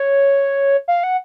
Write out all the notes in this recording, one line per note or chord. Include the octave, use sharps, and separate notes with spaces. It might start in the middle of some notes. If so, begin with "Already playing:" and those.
Already playing: C#5
F5
F#5